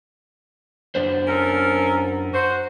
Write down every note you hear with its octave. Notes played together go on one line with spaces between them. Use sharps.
F#2 D4 C5
C#4 A4 A#4
F#4 C5